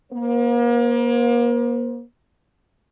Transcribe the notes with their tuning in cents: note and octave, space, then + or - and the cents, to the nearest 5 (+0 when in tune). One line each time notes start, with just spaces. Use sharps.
A#3 +35 C5 +0